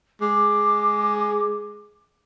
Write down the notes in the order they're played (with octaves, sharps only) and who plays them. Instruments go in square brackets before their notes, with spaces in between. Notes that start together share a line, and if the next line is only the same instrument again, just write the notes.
[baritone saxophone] G#3 [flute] D6